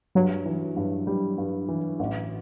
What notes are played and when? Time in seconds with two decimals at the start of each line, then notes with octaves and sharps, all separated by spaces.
0.15 G2 F#3
0.46 E3
0.76 G2
1.07 G3
1.38 G2
1.68 E3
1.99 A1